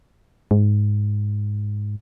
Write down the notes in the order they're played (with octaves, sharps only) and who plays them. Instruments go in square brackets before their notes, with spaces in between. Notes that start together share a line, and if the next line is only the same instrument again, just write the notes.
[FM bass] G#2